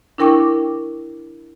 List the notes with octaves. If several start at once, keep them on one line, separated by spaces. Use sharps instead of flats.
D4 E4 A#4 G5 C#6 D6